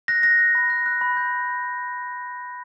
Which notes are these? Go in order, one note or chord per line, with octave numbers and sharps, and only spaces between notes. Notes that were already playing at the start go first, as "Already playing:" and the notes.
F#6 A#6
F#6 A#6
F#6
B5
F#6
F#6
B5
G6